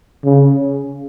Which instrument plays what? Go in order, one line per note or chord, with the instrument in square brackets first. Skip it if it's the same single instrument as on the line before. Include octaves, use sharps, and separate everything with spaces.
[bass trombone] C#3